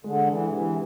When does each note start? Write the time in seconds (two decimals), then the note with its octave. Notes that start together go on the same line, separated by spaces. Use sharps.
0.04 D3 G#3
0.27 E3 D4
0.50 C3 E3